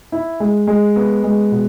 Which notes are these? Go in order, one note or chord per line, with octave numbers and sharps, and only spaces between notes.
E4
G#3
G#3
B3
G#3
B2